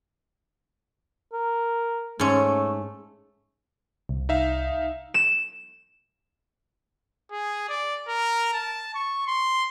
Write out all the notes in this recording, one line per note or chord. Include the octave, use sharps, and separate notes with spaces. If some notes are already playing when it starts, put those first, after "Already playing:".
A#4
G#2 A3 C#4
C2
D#4 E5 F5
E7
G#4
D5
A#4
A5
C#6
C6